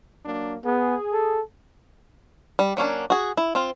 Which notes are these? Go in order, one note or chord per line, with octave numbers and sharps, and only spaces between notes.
F#3 A#3 D4
B3 G#4
A4
G3
F#3 A#3 C#4 D4
F#4 G#4
E4
C4 F4